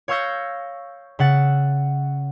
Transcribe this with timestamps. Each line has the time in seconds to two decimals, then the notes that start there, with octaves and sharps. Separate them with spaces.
0.08 C#5 F5 C#6 E6 G6 A#6
1.19 C#3 E5 F#5 A6